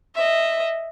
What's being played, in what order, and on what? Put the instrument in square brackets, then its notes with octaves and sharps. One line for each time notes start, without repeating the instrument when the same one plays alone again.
[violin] D#5 E5